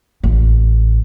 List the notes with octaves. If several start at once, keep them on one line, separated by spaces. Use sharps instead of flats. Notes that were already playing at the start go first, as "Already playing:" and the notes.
A1